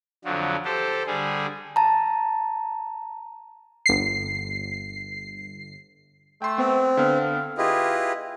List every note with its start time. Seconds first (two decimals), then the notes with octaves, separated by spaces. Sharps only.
0.25 F2 D3 F3 F#3
0.65 G4 A4 C5
1.07 D3 G3 G#4
1.76 A5 A#5
3.86 G1 C7
6.42 A3 G5 C6
6.58 B3 C4
6.97 D3 B3 F5
7.58 E4 F4 G4 G#4 B4 D#5